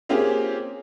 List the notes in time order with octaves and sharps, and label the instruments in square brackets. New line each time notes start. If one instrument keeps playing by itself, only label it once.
[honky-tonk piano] A#3 C4 C#4 F4 G4 G#4